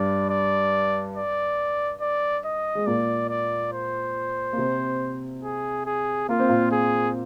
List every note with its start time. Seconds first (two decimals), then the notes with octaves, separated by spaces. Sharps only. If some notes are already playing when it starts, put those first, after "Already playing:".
Already playing: G2 G3 D5
0.30 D5
1.16 D5
2.01 D5
2.45 D#5
2.75 G#3
2.86 A#2 A#3 D5
3.29 D5
3.72 C5
4.53 A#3
4.57 C3 C4
5.43 G#4
5.86 G#4
6.29 A#3 F4
6.39 C4
6.49 A#2 A#3
6.72 G#4